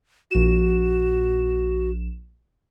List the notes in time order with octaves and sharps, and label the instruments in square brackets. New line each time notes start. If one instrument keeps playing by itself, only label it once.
[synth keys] A#1 E7 [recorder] F#4